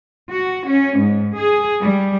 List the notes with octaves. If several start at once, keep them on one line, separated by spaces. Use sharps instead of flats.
F#4
C#4
G#2
G#4
G3